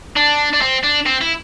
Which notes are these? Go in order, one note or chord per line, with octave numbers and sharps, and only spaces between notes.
D4
D4
C4
D4
C4
E4